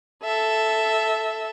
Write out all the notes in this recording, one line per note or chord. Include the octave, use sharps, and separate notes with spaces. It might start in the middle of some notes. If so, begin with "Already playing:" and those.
A4 E5